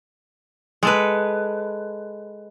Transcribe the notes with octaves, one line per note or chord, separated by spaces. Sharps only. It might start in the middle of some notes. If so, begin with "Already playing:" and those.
G#3 A4 B4